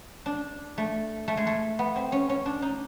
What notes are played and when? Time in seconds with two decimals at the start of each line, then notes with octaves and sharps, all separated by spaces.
0.26 D4
0.78 A3
1.28 A3
1.37 G#3
1.47 A3
1.79 B3
1.96 C4
2.12 C#4
2.30 C#4
2.46 D4
2.62 D#4